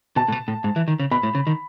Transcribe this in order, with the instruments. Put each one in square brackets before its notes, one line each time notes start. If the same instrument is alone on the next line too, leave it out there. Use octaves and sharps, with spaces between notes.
[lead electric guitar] B2 [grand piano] A5
[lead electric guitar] A2
B2
A2
G#2
E3
D#3
C#3
[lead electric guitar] B2 [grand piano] B5
[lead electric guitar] A2
C#3
D#3